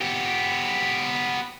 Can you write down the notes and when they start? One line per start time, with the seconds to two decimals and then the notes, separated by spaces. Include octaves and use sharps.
0.01 B3 G4